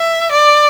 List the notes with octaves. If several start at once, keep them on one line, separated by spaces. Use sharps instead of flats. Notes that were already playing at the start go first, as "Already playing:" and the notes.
Already playing: E5
D5